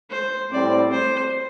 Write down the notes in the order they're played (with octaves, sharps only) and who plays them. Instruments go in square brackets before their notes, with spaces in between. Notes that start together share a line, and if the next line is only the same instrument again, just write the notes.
[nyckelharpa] C5
[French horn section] A2 G3 C4 [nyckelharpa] D5
[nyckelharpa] C5